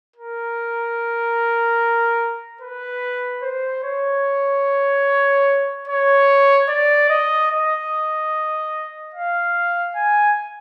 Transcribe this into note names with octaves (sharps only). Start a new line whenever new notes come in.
A#4
B4
C5
C#5
C#5
D5
D#5
D#5
F5
G#5